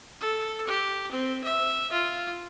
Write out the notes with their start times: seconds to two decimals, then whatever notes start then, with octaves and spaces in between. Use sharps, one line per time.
0.20 A4
0.67 G4
1.11 C4
1.44 E5
1.92 F4